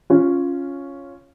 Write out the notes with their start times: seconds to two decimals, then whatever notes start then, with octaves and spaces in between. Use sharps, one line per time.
0.10 C#4 F4